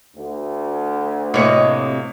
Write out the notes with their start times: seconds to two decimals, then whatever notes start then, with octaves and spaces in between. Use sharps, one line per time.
0.16 D2
1.34 A2 C3 A#3 C#5 D#5 C#7